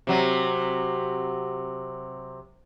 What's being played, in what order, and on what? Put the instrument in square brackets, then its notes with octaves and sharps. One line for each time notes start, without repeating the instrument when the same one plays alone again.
[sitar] C3 F#3